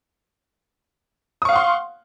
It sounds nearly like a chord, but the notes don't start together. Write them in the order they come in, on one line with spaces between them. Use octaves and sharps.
D#6 C#6 F5 F#5 C6